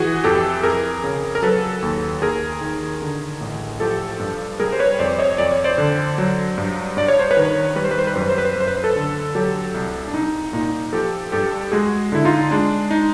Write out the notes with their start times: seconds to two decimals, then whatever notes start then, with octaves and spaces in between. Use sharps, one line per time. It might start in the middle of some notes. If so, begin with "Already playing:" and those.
Already playing: E3 F#4 G#4
0.24 F2 G4 A4
0.63 F2 G#4 A#4
1.04 C#3
1.35 A#4
1.42 F#3 A4 B4
1.82 D#2
2.22 D#2 G#4 A#4
2.61 D#3
3.02 D3
3.40 A1
3.80 F3 G4 A4
4.20 G2
4.60 G3 G#4 A#4
4.73 C5
4.79 B4 C#5
4.99 F2 C5 D5
5.19 C#5 D#5
5.38 F2 D5
5.51 C#5
5.64 C5 D5
5.78 D3
6.18 F#3
6.58 G2
6.97 G2 D5
7.08 C#5
7.19 C5
7.31 B4 C#5
7.37 D#3
7.76 G3 B4
7.84 C5
7.91 B4
7.99 C5
8.07 B4
8.14 F#2 C5
8.22 B4
8.29 C5
8.38 B4
8.45 C5
8.53 F#2 B4
8.60 C5
8.67 B4
8.76 C5
8.83 A4 B4
8.96 D3
9.35 F#3 G4 A4
9.74 C2
10.07 D4
10.13 C2 D#4
10.53 A#2 D#4
10.93 F3 G4 A4
11.32 G2 G4 A4
11.72 G#3 F#4 G#4
12.12 D3 E4
12.25 D#4 F4
12.51 G#3 D4
12.91 D#4